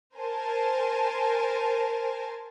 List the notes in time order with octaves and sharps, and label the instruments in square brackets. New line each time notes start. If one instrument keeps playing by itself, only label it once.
[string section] A#4 C5 G#5 A5